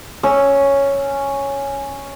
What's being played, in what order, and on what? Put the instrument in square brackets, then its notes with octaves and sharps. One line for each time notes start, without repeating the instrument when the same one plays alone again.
[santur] C#4 E6